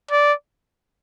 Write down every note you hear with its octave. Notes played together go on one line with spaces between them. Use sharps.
D5